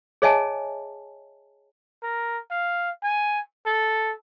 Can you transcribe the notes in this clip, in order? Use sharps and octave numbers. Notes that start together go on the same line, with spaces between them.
G#4 C#5 D#5 E5 G#5 A5
A#4
F5
G#5
A4